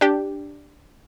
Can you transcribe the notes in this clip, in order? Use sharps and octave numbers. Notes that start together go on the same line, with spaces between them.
D4 G4